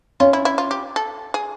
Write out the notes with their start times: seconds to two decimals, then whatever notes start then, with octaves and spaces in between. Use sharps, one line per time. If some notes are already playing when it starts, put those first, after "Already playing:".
0.20 C#4 F4
0.33 E4
0.45 E4
0.58 F4
0.71 G4
0.96 A4
1.34 G#4